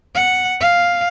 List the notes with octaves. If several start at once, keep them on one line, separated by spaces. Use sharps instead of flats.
F#5
F5